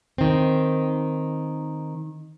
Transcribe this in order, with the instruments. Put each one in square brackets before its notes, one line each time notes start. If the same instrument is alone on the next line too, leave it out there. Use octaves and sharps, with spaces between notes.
[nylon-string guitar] D#3 C4